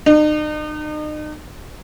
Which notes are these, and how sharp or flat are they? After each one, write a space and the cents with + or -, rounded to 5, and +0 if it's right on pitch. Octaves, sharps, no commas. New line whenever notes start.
D#4 -40